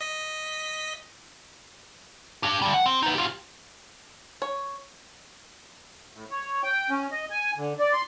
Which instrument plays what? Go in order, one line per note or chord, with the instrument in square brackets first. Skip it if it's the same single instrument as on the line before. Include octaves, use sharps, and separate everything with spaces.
[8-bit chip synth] D#5 B6
[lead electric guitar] D4 G4
D3 G3
F#5
C4
D#4 B4
F4 G4
[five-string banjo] C#5
[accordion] A2
C#5
G5
C#4
D#5
G#5
D3
D5
C6